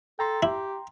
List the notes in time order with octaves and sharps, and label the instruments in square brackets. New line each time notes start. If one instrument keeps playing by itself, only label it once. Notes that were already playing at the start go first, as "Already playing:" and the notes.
[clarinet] A4 [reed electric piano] G5 A#5 C6
[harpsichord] E4 [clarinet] G4